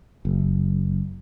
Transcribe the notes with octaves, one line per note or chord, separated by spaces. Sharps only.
F#1